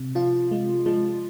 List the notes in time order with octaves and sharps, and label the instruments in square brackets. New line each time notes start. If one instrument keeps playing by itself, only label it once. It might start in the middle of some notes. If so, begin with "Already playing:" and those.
Already playing: [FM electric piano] C3
[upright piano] F3 [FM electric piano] F4
[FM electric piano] G#3
[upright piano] F3 [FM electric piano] G#3